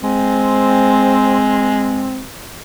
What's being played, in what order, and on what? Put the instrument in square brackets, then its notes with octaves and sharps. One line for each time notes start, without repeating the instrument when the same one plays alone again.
[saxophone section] G#3 C4